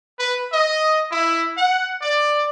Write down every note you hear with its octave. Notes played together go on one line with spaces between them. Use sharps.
B4
D#5
E4
F#5
D5